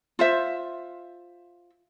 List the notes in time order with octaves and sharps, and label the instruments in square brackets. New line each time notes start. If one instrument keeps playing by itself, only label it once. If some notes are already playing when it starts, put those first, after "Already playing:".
[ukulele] F4 C5 E5